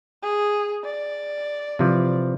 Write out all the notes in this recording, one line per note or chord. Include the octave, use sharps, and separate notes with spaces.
G#4
D5
C3 E3 F3